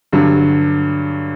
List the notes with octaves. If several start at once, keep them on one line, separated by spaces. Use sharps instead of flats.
G2 D3 F#3